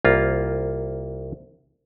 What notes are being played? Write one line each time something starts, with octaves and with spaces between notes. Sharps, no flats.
C2 A#3 F4